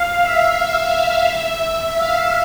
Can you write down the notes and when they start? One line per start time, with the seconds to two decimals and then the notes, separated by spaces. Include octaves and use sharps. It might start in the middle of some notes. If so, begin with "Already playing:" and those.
Already playing: F5
0.22 E5
1.97 F5